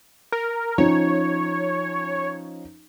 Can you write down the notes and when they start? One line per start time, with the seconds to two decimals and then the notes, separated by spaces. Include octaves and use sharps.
0.32 A#4
0.78 F3 C#4 D#4 C#5